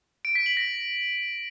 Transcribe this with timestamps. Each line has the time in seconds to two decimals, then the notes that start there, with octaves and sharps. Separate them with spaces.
0.25 D7
0.35 B6
0.46 F#7
0.57 A#6